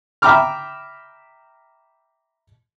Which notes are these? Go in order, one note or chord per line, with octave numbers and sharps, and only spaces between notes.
E5 G5 A#5 B5 D6 F6